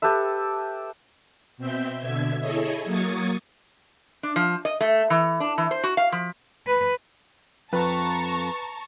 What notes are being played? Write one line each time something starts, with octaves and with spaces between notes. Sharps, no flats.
G4 A4 B4 E5
B2 C4 E5 G6
B2 D3 E5 G#6
E4 G#4 A4 C#5 D#5 E5
F#3 A#3 C#6 D#6 G#6 A6
D4
F3
D#5
A3
E3
D4
E3
C5
F#4
F5
F3
B4
F2 B4 A5 A#5 C#6